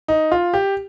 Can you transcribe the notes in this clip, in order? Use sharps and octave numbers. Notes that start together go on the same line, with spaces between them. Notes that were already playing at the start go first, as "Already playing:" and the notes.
D#4
F4
G4